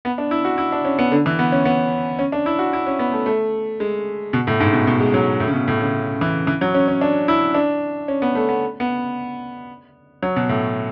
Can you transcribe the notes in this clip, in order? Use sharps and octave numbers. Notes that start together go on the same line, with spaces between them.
B3
D4
E4
F#4
E4
D4
C#4
B3
D3
E3
B3
C#4
B3
C#4
D4
E4
F#4
E4
C#4
B3
A3
A3
G#3
B2
A2
G#2
B2
B2
G#3
F#3
A2
C#3
B2
A2
C#3
E3
E3
F#3
C#4
C#4
D4
E4
D4
C#4
B3
A3
B3
B3
F#3
B2
A2